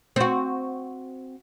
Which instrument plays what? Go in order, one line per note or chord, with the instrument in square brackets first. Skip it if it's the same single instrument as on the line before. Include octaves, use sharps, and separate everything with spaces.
[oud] C4 F#4